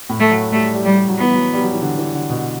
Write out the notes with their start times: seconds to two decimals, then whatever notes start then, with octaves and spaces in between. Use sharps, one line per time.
0.09 A2
0.20 A3
0.31 F#3
0.52 G3 A3
0.74 G3
0.85 G3
0.96 G3
1.08 F#3
1.17 E3 B3
1.34 F#3
1.53 G3
1.62 F#3
1.73 E3
1.82 D3
1.98 E3
2.14 D3
2.30 B2